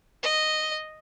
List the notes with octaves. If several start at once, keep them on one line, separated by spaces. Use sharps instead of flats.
D#5